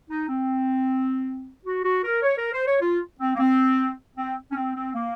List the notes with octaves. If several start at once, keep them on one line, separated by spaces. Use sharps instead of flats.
D#4
C4
F#4
F#4
A#4
C#5
A#4
C5
C#5
F4
C4
A#3
C4
C4
C#4
C4
C4
A#3